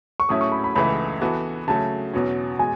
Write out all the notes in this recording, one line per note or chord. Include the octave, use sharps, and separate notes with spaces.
C#6
A2 F#3 A3 C#4 E4 D#6
C#6
B5
B5
C#2 C#3 E3 A3 E4 B5
E3 B3 F#4 A4
C#3 F#3 A3 A5
E2 B2 F#3 C#4
B2 G#3 G#5